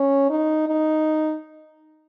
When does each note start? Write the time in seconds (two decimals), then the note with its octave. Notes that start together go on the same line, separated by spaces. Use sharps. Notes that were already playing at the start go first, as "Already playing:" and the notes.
Already playing: C#4
0.30 D#4
0.68 D#4